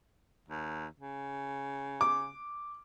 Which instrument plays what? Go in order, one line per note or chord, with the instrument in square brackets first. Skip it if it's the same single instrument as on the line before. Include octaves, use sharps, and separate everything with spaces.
[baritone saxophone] D#2
C#3
[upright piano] D6